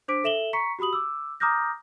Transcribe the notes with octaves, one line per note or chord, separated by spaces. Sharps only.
D4 C5 D6 B6 D7
A4 E5 E7 F#7 G7
A#5 C#6 B6 C#7
F#4 G4 B5 D#6 F#7
D6 E6
A#5 D6 D#6 F6 G6 A#6